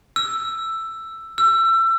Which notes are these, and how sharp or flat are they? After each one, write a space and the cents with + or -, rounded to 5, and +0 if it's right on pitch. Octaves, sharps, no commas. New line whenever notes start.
E6 +10
E6 +30